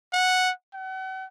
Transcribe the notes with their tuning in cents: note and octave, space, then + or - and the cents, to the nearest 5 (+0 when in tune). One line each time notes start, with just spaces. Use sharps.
F#5 -5
F#5 +40